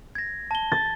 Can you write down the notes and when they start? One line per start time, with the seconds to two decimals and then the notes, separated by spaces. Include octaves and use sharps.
0.15 G#6 A#6
0.51 A5 G7
0.72 A6